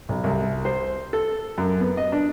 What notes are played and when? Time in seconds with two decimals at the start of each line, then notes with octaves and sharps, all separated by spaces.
0.09 B1
0.24 C2
0.65 C5
1.13 A4
1.58 F#2
1.80 B3
1.97 D#5
2.12 D4